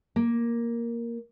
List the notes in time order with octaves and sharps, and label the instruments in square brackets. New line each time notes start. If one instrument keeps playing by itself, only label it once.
[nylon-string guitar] A#3